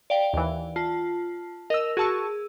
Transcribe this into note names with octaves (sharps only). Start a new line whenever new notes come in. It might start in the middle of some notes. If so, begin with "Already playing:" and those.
D5 F5 G5
D#2 E3
F4 A5
A#4 D#5 E6
F#4 G#4 A5 C#6 E6